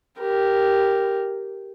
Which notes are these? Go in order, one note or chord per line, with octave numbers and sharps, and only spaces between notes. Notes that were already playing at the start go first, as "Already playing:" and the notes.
G4 A#4